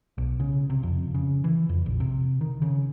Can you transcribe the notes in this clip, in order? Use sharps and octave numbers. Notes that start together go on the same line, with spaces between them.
B1
C#3
C3
F2
C#3
E3
F2
A#1
C3
D#3
C#3